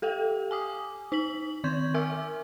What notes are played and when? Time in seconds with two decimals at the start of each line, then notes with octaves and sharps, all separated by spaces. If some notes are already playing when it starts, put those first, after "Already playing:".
0.02 G4 A4 F5 G5
0.51 G#5 D6 D#6
1.12 D#4 B6 F#7
1.64 D#3 C6 C#6 G6 G#6
1.94 A#4 E5 G#5 D6 E6 F6